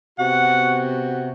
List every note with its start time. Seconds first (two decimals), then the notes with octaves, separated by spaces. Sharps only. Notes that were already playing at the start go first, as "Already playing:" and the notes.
0.19 C3 B3 F#4 F#5